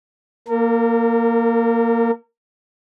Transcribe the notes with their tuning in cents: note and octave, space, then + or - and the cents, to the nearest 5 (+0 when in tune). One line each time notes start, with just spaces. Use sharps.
A#3 +0 A#4 -35